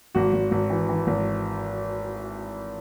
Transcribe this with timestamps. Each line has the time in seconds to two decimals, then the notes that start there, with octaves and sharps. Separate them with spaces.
0.15 G#1 F#4
0.33 G#1
0.51 G#1
0.70 E3
0.89 E3
1.07 G#1